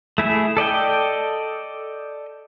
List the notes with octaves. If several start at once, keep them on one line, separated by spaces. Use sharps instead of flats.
A3 E4 G#4 E5
A4 D5 D#5 G5